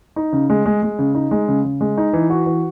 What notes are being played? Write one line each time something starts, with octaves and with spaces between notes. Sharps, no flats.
D#4
C#3
G#3
G#3
G#3
C#3
D#4
G#3
C#3
C#3
G#3
D#4
E3
F#4
E3